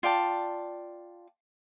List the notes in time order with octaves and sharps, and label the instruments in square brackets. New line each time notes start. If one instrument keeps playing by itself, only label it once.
[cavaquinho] F4 D5 G5 A5